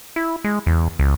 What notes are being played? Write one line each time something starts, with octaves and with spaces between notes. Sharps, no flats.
E4
G#3
E2
C#2